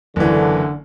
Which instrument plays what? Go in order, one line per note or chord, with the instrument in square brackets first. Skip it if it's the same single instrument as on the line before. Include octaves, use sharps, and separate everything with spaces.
[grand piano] F#1 E3 [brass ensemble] D3